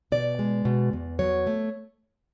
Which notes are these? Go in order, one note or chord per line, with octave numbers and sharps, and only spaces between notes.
B2 D5
G#3
B2
E2
F#3 C#5
A3